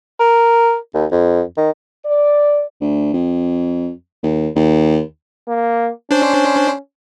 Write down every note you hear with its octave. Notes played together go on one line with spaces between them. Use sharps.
A#4
D#2
F2
D#3
D5
D2
F2
D#2
D#2
A#3
C#4 D4 C5